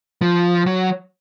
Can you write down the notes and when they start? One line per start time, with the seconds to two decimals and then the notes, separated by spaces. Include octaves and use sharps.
0.22 F3
0.66 F#3